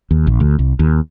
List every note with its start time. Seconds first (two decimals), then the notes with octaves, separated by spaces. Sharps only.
0.11 D#2
0.27 A#1
0.40 D2
0.59 C2
0.79 D#2